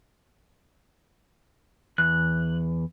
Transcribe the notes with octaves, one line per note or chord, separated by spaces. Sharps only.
E2 F#6